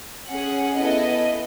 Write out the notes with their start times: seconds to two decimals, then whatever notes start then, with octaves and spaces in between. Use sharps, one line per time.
0.29 C#4 G#4 F#5
0.78 B3 E4 A4 D#5